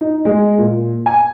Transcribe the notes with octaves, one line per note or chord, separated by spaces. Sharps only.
D#4
G#3
A#2
G#5